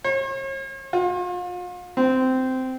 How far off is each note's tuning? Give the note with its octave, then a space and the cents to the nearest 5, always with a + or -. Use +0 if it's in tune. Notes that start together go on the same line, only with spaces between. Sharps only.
C#5 -45
F4 +40
C4 -15